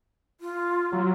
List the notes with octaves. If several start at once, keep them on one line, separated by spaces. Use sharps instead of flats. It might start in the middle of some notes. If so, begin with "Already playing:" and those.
F4
F#3